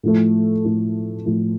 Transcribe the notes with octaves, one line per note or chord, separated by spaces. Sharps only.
A2 F3 A3
A2 F3 A3
A2 F3 A3